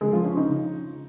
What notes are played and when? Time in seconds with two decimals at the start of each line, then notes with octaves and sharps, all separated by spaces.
0.01 C#3 F3 G#3 G#4
0.13 F3 F4
0.25 C#4
0.37 D#4
0.49 C#3